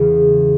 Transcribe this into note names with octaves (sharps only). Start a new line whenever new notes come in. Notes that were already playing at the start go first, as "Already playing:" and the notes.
Already playing: E2 C#3 E3 B3